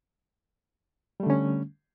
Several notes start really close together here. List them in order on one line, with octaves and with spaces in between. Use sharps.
G3 A3 D3 C#4